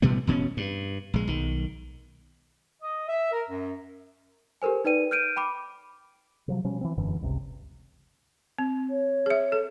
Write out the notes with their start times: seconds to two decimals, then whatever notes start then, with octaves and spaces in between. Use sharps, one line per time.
0.02 A1 B2 G3 B3
0.27 E1 B2 B3 C#4
0.57 G2
1.14 A#1 G#3
1.28 B1 D#3
2.82 D#5
3.08 E5
3.32 A#4
3.50 F#2
4.62 G4 A4 A#4 C5 G#5
4.85 D#4 B4 D5 G5 D#7
5.11 F6 G6 D7 D#7
5.36 G5 B5 D6
6.48 C3 F3 F#3
6.64 B2 F3 G3 C#4
6.81 E3 F3 C4
6.97 E1 F#2 D3 E3
7.21 G1 C#2 C3
8.59 C4
8.90 C#5
9.26 G#4 E5
9.52 A4